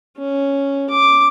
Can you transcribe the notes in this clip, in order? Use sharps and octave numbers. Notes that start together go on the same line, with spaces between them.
C#4
D6